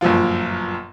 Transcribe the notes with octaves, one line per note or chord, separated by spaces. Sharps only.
G1 F#2 A#2 F3 F4